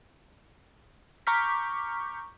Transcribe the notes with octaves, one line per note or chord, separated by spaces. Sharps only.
A#5 C#6 D6 F6 G6 B6